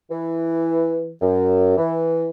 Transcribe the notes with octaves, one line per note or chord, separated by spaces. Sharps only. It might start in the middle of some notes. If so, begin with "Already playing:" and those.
E3
F#2
E3